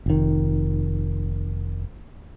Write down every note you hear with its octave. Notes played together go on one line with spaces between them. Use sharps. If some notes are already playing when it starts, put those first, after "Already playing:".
F1 D#3